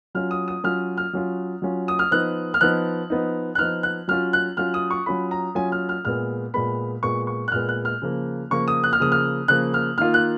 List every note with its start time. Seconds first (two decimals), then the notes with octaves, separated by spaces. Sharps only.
0.15 F#3 C#4 F4 F6
0.31 D#6
0.48 D#6
0.64 F#3 C#4 F4 F6
0.97 F6
1.13 F#3 C#4 F4
1.62 F#3 C#4 F4
1.88 D#6
1.99 F6
2.11 F3 B3 D#4 F#6
2.54 F6
2.61 F3 B3 D#4 F#6
3.10 F3 B3 D#4
3.55 F#6
3.59 F3 B3 D#4 F6
3.83 F#6
4.08 F#3 C#4 F4 F6
4.33 F#6
4.57 F#3 C#4 F4 F6
4.74 D#6
4.91 C#6
5.06 F#3 C#4 F4 B5
5.31 A#5
5.55 F#3 C#4 F4 G#5
5.72 F6
5.89 F6
6.05 A#2 G#3 B3 F6
6.54 A#2 G#3 B3 B5
7.03 A#2 G#3 B3 C#6
7.27 C#6
7.48 F#6
7.52 A#2 G#3 B3 F6
7.69 F#6
7.85 F6
8.02 C#3 F3 A#3
8.50 C#3 F3 A#3 C#6
8.68 D#6
8.84 F#6
8.93 F6
9.00 C#3 F3 A#3 D#6
9.12 F6
9.48 C#3 F3 A#3 F#6
9.74 F6
9.98 D#3 A#3 F4 F6
10.14 F#6